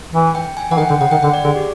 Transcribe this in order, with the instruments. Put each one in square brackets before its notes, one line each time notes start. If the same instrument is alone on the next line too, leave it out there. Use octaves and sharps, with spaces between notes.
[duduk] E3
[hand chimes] G5
G#5
[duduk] E3 [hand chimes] F#5
[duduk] D#3 [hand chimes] G5
[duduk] D3 [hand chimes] G5
[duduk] C#3 [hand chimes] F#5
[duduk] D#3 [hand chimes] G5
[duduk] D3 [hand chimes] G5
[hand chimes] D5
[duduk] D3 [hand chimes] G#4
[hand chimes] G4